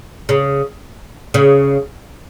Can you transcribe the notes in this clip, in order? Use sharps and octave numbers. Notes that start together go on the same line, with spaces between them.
C#3
C#3